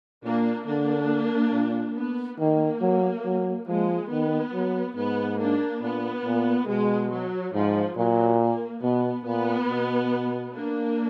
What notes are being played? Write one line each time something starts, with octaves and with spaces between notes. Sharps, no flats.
A#2 A#3 D4
D3 A#3 D4
A#2
B3
D#3 A#3
F#3
F#3
F3 G#3
D#3 B3
F#3
G#2 B3
A#3 D4
A#2 B3
A#2
B2 G#3
F#3
G#2 F3
A#2 F#3
A#3
B2 B3
A#2 B3
B2
A#3 D4